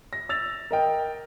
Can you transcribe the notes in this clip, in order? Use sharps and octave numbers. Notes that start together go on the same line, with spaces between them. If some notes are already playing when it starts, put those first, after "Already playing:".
A#6
E6 A6 F7
A#4 D#5 G5